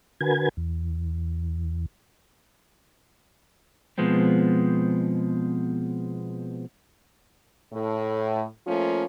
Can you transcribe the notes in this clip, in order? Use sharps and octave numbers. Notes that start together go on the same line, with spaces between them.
D3 F#4 A#4 B4 G#5 G#6
E2
B2 F3 G#3 B3 C4
A2
F3 A3 A#3 C#4 F4